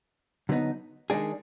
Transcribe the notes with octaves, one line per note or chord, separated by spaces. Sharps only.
D3 F#3 B3 D#4
D#3 G#3 D4 G#4